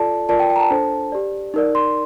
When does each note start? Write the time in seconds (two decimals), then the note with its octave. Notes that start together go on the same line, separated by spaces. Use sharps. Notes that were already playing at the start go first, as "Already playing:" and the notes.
Already playing: F4 A4 D5 A5
0.29 F4 A#4 D5 A5
0.40 G5
0.50 G5
0.56 A#5
0.60 A5
0.70 D4 A4 C5
1.12 G4 D5
1.54 D#4 A#4 D5
1.75 C6